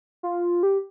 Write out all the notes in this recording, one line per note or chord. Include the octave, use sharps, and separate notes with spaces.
F4
G4